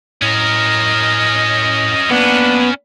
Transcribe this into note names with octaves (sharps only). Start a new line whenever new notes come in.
A2 C#4 A#4 D#5
A#3 B3 D4